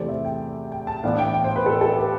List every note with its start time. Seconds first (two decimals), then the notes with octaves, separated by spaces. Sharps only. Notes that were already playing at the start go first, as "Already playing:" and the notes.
Already playing: E2 C3 E3 A3 C5 D5
0.09 E5
0.25 G5
0.72 G5
0.87 A5
1.03 A2 E3 B3 D4 F5
1.19 G5
1.34 G5
1.44 C5
1.56 B4
1.66 A4
1.81 A4
1.97 G4